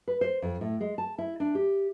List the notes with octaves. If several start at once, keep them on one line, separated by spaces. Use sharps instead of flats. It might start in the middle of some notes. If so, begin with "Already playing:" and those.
B4
C5
F2
A2
G#3
A5
E4
D4
G4